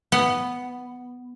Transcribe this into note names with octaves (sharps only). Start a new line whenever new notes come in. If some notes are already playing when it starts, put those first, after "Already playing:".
B3